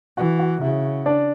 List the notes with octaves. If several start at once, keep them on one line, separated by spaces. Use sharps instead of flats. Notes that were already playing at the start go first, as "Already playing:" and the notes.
E3 F#4 F#5
F#4 F#5
C#3 E4 E5
D4 D5